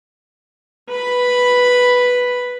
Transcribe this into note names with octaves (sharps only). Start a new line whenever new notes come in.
B4 B5